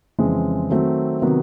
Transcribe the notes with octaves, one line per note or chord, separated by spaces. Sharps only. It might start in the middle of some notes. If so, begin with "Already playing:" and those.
F2 C#3 E3 G#3 C4
D#3 F#3 A3 C4
C3 D#3 F#3 B3